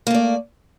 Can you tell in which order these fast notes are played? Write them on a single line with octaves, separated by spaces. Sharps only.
A#3 A3 D5